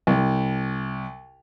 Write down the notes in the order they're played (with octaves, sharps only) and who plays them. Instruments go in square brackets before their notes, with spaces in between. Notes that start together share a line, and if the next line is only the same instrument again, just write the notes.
[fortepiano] C2